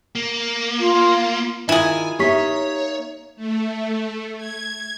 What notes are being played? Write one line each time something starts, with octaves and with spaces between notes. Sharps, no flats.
A#3
F4
D#3 E4 F4 G#4 G#5
A#3 D#4 G4 C#5 E5 C#6 B6
A3
G#6